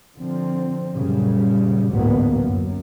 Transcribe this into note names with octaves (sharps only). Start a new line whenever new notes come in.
D3 F3 C4
F#2 A#2 C#3 G3
A1 D2 G#2 F#3 A#3 B3
F#2